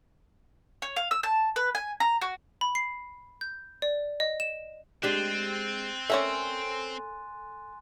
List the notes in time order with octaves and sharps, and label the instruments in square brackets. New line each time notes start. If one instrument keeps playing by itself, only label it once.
[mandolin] C#5
F5
E6
A5
B4
G#5
A#5
F#4
[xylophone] B5
C7
G6
D5
D#5
E7
[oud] G#3 D4 G4 [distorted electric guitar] C4 [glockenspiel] F#6 A6 D#7
[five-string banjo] C#4 A#4 E5 [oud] A4 C#5 D5 [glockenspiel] G#5 C6